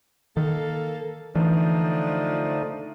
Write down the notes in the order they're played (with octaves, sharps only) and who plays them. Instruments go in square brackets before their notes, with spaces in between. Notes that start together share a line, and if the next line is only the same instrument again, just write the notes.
[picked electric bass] D#3 [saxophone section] A#3 A4
[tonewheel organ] D3 A3 D#4 [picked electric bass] E3 [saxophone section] F3 D4